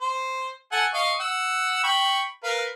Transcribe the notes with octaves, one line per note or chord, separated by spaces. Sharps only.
C5
A4 F#5 G#5
D#5 F5 C#6
F#5 E6
G5 B5 C#6
A#4 B4 F5